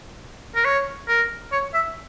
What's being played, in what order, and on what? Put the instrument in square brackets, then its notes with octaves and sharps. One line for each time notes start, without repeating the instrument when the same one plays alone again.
[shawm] A#4
C#5
A#4
C#5
E5